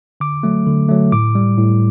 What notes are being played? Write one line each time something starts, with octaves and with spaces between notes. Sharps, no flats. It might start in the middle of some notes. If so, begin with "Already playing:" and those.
D3 D6
F#3 A3
D3
F#3 A3
A2 D6
G3
A2